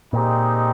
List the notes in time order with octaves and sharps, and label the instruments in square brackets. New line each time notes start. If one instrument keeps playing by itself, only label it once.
[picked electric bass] A#2 [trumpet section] G#3 C4 D#4 G4